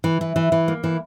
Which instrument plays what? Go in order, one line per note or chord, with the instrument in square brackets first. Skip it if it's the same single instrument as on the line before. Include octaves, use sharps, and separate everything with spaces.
[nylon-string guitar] E3
E3
E3
E3
A#3
E3